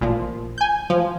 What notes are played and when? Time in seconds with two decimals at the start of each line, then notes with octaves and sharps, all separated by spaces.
0.01 A1 A#2 F3
0.58 G#5 G6
0.90 F3